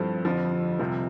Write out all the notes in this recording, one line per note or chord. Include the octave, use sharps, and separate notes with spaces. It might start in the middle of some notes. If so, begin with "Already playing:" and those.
Already playing: G2 F3 C4 E4 A4
F2 D3 F3
C2 C3 F3 C4